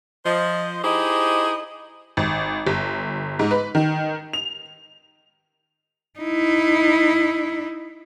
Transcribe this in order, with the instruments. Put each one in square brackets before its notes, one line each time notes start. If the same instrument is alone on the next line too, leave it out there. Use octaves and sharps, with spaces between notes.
[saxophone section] F3 C5 D#5
D#4 E4 G4 G#4 C5 D#5
[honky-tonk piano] G#1
G1
G#2
B4
D#3
F7
[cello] D#4 E4